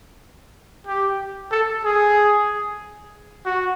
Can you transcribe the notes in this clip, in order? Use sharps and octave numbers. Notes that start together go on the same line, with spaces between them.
G4
A4
G#4
F#4